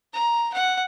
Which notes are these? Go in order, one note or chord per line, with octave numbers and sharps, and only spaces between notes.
A#5
F#5